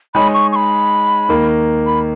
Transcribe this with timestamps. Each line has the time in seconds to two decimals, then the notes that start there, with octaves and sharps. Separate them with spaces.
0.14 G#3 D#4 G#4 C#5 B5
0.34 C#6
0.52 C#6
0.56 B5
1.29 D#2 D#3 A#3
1.86 B5